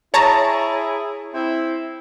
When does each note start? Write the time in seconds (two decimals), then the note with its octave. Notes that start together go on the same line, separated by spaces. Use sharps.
0.14 E4 G#4 C#5 A5 A#5
1.34 C4 E4